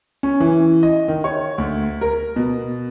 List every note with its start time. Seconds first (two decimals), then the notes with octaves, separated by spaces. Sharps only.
0.23 C#4
0.40 E3
0.83 D#5
1.08 D#3
1.24 C#5
1.58 D2
2.01 A#4
2.36 B2